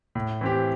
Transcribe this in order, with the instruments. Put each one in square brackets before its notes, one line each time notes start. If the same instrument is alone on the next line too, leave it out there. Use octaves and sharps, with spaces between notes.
[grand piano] A2
E3 C4 G4